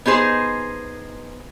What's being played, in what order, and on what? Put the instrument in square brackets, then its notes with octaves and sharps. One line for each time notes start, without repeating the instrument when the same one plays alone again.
[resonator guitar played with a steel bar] B3 D#4 G#4 C5